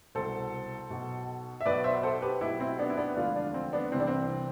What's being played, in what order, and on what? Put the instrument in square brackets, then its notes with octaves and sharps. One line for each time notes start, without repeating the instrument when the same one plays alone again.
[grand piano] C2 B2 A4 C5
B1 B2
E5
B1 B2 B4 D5
C5 E5
A4 C5
G4 B4
B1 B2 E4 G4
C4 E4
B3 D4
E4
B3 D4
E1 D2 D3 F3 D4 F4
D4 F4
C4
B3 D4
C2 C3 E3 C4
D4
C4